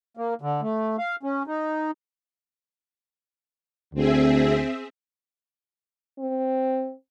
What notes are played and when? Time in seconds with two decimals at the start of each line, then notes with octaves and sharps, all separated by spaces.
0.17 A#3
0.42 D3
0.61 A3
0.99 F5
1.23 C#4
1.47 D#4
3.94 D2 C4 G#4 E5
6.19 C4